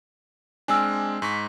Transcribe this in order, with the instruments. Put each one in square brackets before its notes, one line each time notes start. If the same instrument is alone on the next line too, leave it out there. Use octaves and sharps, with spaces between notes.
[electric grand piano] G#3 C4 D4 [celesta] G#5 E6 F6
[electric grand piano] G#2 C#6 B6